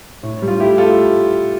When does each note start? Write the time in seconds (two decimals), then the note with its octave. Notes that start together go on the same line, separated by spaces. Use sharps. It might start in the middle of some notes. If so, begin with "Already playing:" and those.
0.23 A2
0.42 G3
0.48 F4
0.60 A3 E4 G4
0.78 A3 F4 A4